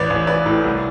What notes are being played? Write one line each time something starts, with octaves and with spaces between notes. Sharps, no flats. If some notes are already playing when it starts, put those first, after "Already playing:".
Already playing: A1 B4 D5
A1
A1 B4 D5
A2
C2